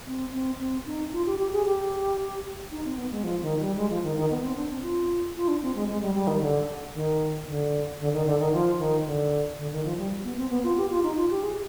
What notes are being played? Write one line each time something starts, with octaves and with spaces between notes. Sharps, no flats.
C4
C4
C4
D#4
F4
G4
G4
G#4
G4
D#4
C4
B3
G#3
F3
D#3
G3
G#3
F3
D#3
D#3
B3
C4
D4
C4
F4
F4
D4
C4
G#3
G#3
G3
G3
D#3
D3
D#3
D3
D3
D#3
D3
D#3
F3
D#3
D3
D3
D#3
F3
G3
B3
C4
B3
F4
G4
F4
D#4
F4
G4
G#4